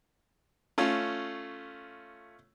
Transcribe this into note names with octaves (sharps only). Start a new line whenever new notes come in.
A3 C#4 F4